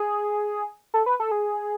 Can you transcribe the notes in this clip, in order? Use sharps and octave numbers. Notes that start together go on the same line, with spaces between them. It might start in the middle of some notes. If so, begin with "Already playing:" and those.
Already playing: G#4
A4
B4
A4
G#4